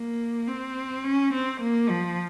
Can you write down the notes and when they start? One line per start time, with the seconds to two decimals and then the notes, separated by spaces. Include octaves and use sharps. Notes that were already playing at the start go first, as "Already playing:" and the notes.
Already playing: A#3
0.47 C4
1.04 C#4
1.33 C4
1.61 A#3
1.89 F3